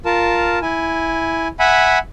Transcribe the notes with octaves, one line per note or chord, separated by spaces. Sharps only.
F4 A#4 A5
E4 G#5
E5 F#5 G#5 B5